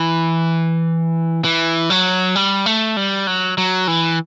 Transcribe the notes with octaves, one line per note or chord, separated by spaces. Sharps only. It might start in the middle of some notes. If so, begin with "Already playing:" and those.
Already playing: E3
E3
F#3
G3
A3
G3
F#3
F#3
E3